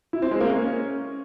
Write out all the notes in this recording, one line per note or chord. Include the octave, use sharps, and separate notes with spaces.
E4
C4
G#3
A#3
C#4